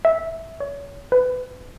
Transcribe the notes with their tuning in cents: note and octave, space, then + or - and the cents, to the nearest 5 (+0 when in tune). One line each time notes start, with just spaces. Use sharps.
E5 -10
C#5 +30
B4 +30